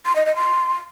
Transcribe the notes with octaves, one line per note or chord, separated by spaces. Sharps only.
C6
D#5
D#5
C6